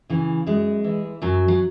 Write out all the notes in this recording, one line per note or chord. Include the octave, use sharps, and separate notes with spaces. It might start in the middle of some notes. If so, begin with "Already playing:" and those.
C#3 E3
F#2 G#3
E3
F#2 F#3
F#3